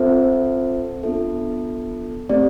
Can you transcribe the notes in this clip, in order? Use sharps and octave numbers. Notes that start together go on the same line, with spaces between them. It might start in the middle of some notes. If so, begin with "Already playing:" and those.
Already playing: C4 F4 A4 C5 E5
B3 D4 F4 A4 E5
A3 C4 G4 D5